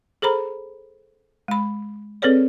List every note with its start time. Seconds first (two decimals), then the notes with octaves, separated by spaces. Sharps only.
0.22 G#4 A4 C5 A#5 B5
1.48 G#3 B5
2.22 C4 G#4 A4 B4 C#5 D5